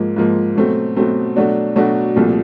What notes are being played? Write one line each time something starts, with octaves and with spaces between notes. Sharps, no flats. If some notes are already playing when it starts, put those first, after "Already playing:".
Already playing: G#2 F3 A#3
G#2 F3 A#3
B2 F#3 A3 C4
B2 F#3 A3 C4
B2 F#3 A3 D4 F#4
B2 F#3 A3 D4 F#4
C2 A#2 F3 A3